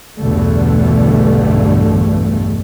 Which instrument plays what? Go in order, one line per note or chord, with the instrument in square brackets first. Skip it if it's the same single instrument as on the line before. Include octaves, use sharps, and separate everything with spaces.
[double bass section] B1 E2 G2 B2 D3 A3